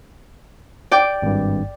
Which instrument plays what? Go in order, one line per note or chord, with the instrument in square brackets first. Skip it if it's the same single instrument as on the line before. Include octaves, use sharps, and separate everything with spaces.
[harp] D5 G5 D6
[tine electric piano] G#1 G2